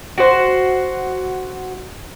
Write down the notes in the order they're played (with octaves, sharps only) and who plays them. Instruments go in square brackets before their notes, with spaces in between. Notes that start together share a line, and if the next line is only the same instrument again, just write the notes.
[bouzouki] F#4 C5